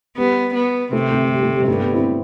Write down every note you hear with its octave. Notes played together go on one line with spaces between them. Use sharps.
G3 B3
B3
C3 A3
A3 C4
G3
A3
G3
G2 A3
G3 B3
C4 E4